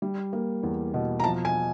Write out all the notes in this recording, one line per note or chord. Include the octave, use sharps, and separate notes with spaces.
G3
A#3
E2
B2
A#5
F3 A5
G#5